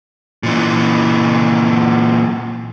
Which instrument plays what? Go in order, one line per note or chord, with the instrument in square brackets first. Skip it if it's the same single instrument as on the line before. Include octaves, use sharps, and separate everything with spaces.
[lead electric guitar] A#2 E3